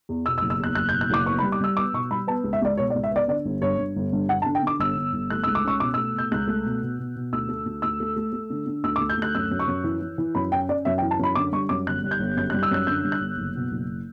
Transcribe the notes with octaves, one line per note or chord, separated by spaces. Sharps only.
E2
B2 E6
E6
F#1
E6
E2 F#6
F#1 F#6
G6
B2
F#6
F#1 D6
B3 C#6
B5
G3
D6
G3 E6
B3 D6
B2 C#6
G3 B5
B3 A5
C#2
E5
C#2 D5
B2 C#5
D5
C#2
E5
B3 D5
D3 D5
G1
G2 C#5
G2
G1
G2
D3 F#5
A5
D3
G5
D3 D6
G1 E6
G1
G1
A3 F#6
E6
C#2
D6
C#4 C#6
B2 D6
E6
A3
B2 G6
C#2 F#6
A3
B2
B2
B2
B2
D2 E6
A3
D2
D2 E6
A3
A3
A3
D3
D3
D2 E6
D6
D2
G6
D2 F#6
F#2 E6
F#2
C#6
F#2
E3
E3
E3
F#2 B5
C#4 G5
C#4 D5
F#2 E5
G5
E3
A5
F#2 B5
D3 D6
G3 C#6
F#2 D6
G1 F#6
G3
G6
G1
F#2 G6
F#6
G3
E6
F#2 F#6
D3 G6
G3
F#6
G1
F#1
B2
F#1